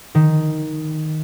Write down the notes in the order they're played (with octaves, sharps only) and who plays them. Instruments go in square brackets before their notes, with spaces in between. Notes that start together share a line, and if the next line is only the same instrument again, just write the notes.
[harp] D#3